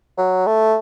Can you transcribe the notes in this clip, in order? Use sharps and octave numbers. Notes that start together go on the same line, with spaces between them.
F#3
A3